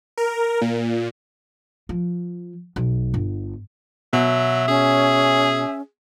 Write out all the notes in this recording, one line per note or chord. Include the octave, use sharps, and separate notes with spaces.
A#4
A#2
F3
B1
G1
B2 F#3 E5
C#4 G#4